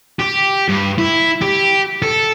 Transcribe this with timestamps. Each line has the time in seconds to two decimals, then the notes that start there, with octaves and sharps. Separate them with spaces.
0.19 G4
0.69 G2
0.98 E4
1.42 G4
2.02 A4